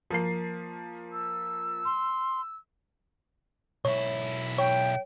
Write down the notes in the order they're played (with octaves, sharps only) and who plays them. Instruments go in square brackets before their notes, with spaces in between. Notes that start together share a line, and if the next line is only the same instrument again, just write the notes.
[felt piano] F3 A#3 C7
[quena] E6
[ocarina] C6
[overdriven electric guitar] B1 E4 [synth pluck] C#5
[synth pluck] C#5 [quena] G5